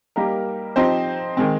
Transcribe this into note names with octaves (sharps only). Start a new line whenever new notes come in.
G3 A#3 D#4 G4 A#4
F3 C4 D#4 G4 C5
D#3 G#3 C4